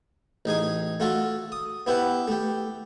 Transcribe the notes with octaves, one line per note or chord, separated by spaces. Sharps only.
A1 D#4 G#4 G#5
A3 F4 F#4 A4
D#6
B3 E4 G4 B4 F#5
A3 G4